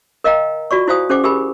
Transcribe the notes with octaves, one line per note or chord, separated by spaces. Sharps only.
A#4 D#5 F5 G5 A#5
F4 F#4 D5 C#6
E4 F#4 C5 F5 G#5 D#6
C#4 G#4 C5 F#5 G#5 D6
G4 G#4 A#4 G#5 B5